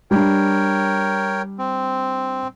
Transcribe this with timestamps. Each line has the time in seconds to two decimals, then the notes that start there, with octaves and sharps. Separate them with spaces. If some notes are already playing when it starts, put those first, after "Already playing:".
0.11 G3 D4 A#4 C#5 G5
1.58 C4